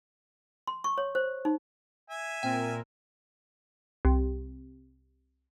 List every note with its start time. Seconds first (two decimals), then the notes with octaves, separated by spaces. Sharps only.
0.67 C6
0.84 C#6
0.98 C#5
1.15 C5
1.45 D#4
2.10 E5 G#5
2.43 A#2 C4 A#4 G5
4.05 C2